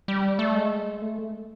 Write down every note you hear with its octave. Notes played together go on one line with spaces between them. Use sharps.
G3
A3
G#3
A3